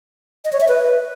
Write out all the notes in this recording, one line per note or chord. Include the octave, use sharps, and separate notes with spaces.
D#5
C#5
E5
B4